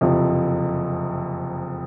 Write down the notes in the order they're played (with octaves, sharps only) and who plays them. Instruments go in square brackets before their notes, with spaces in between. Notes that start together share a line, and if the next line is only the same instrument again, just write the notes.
[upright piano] F#1 F2 C3 F3